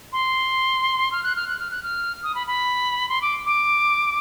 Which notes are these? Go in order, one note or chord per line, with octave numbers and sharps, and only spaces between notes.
C6
F6
F#6
F6
F#6
F6
F#6
F6
D#6
B5
B5
C6
D6
D6